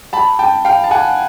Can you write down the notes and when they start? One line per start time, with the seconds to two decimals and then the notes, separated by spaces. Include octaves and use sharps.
0.13 A5 B5
0.39 G5 A5
0.65 F5 G5
0.84 A5
0.91 F#5 G#5